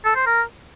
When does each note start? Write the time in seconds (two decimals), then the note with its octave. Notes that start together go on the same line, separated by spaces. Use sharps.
0.05 A4
0.16 C5
0.26 A#4